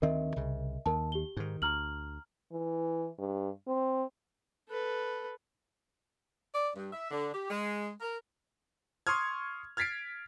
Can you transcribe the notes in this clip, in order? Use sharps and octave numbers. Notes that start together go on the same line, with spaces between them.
D2 D#3 C4 A#4 D#5 E5
C2 C#3
D#2 A#4 A5
G4 G7
G#2 D#3
D2 A#5 F6 F#7
E3
G2
C4
A4 B4
D5
G2
E5
D3
G4
G#3
A#4
C6 C#6 D#6 F6 G#6
F6 G#6 A6 B6 C7 D7